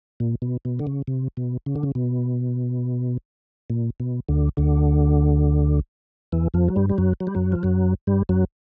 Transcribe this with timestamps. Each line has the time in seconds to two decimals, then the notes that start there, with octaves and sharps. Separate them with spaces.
0.20 A#2
0.42 B2
0.65 B2
0.79 D3
0.87 C#3
1.07 C3
1.37 B2
1.66 C#3
1.76 D3
1.83 C#3
1.95 B2
3.70 A#2
4.00 B2
4.29 D2 D3
4.57 D2 D3
6.32 E2 E3
6.54 F2 F3
6.68 F#3
6.76 G2 G3
6.90 G3
6.98 F#2 F#3
7.20 F#3
7.27 G3
7.35 F#2 F#3
7.52 F3
7.63 F#2 F#3
8.07 G2 G3
8.29 F#2 F#3